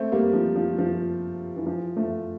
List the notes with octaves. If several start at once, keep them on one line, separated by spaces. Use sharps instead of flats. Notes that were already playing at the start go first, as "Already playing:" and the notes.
Already playing: A3 C4
G3 A#3
F3
F3
F3
E3
F3
F3 A3